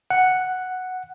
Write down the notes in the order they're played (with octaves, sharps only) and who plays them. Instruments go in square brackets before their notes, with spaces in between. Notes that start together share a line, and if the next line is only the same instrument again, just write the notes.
[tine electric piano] F#5